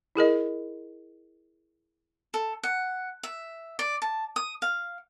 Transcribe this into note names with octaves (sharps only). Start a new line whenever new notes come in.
E4 G#4 A#4 D#5
A4
F#5
E5
D5
A5
D#6
F5